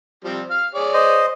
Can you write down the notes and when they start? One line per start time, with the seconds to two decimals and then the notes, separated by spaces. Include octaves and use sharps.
0.24 F3 G3 C4
0.50 F5 F6
0.74 G#4 C#5 D5
0.94 C5 D#5